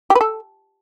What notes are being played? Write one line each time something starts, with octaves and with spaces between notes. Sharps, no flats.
G4
B4
A4